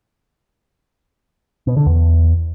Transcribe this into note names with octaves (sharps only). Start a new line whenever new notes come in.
B2
D3
E2